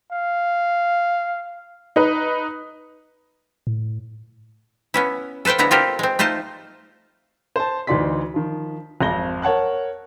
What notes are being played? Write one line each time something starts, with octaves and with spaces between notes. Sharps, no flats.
F5
D#4 B4
A2
B3 C#4 E4
A4 B4 C5 F5 G5
D3 G#3 B3 E4 A#5
C4 E4 F4 G4 A4 A#4
G#3 C4
A3 D#4 F4 C5 A5
C5 A5
D2 E3 D#4 D5 C6 B6
D#3 F3
G#1 F2 A#6 G7
A#4 C#5 F#5 A5 F#6